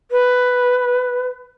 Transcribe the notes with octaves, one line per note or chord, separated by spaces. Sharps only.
B4